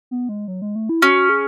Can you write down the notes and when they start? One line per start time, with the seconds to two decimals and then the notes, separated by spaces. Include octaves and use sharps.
0.11 B3
0.29 G#3
0.48 F#3
0.62 G#3
0.76 A3
0.89 E4
1.02 C#4 F#4
1.29 G#4